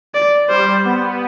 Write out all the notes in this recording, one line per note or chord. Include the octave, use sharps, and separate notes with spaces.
D5
G3 C5
B3